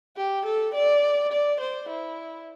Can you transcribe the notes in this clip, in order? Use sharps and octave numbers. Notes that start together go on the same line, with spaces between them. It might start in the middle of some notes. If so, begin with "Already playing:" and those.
G4
A4
D5
D5
C5
E4